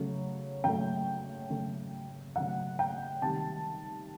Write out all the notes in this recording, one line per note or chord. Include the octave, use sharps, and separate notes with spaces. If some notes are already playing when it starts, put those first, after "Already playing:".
Already playing: C#3 F#3 A3
C#3 F#3 A3 G5
C#3 F#3 A3
C#3 F#3 A3 F#5
G5
C3 D#3 G3 A5